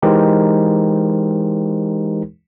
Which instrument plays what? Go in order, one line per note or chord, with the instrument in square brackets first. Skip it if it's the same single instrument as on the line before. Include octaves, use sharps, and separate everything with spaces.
[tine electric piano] E3 G#3 D#4 G4 A#4 C5